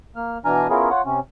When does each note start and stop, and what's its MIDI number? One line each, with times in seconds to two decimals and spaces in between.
0.16 0.38 58
0.16 0.38 89
0.45 0.67 47
0.45 0.67 52
0.45 0.67 62
0.45 0.67 80
0.45 0.67 82
0.45 0.67 89
0.70 0.89 59
0.70 0.89 61
0.70 0.89 64
0.70 0.89 65
0.70 0.89 68
0.70 0.89 70
0.90 1.02 65
0.90 1.02 73
0.90 1.02 78
1.05 1.20 48
1.05 1.20 61